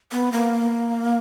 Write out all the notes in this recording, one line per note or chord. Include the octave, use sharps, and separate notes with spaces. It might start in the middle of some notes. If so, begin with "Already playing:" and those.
B3
A#3